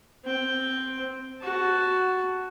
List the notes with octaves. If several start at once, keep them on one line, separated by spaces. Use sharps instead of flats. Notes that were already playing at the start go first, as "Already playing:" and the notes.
C4 G5
F#4 A5